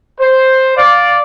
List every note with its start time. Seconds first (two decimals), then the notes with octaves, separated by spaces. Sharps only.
0.20 C5
0.77 D5 F5